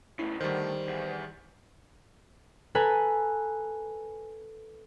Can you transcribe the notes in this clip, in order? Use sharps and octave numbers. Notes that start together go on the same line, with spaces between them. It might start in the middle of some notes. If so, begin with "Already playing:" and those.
A2 C#3 E4
D2 D#3 G3 C5
E2
A4 B4 G#5 A#5